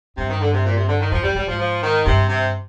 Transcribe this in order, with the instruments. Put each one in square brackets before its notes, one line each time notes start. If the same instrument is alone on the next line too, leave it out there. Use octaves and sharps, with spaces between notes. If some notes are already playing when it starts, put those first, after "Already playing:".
[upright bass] G2 [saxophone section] C3
[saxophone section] D#3
D3
C3
A#2
C3
D3
D#3
[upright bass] F2 [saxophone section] F3
[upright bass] G2 [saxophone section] G3
[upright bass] G#2 [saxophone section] G3
[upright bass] G#2 [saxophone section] F3
[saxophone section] F3
D#3
[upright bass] G2 [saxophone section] C3
[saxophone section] C3